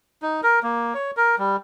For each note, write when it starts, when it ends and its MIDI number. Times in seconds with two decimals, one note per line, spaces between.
0.22 0.41 63
0.43 0.59 70
0.63 0.94 58
0.95 1.11 73
1.17 1.35 70
1.38 1.56 55